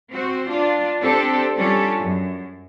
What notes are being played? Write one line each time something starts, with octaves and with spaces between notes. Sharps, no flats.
C4 F#4 C5
D4 F4
C4 D4 G4 A4 C5
G3 C#4 D4 F4 G4 A4
F#2